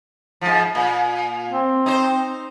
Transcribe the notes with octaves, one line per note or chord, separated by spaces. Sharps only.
G#2 F3
A#2
C4
D#4 C5